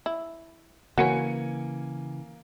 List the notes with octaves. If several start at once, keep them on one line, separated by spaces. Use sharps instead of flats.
E4
C#3 E3 A#3 F#4 B4 C#5 G#5 C#7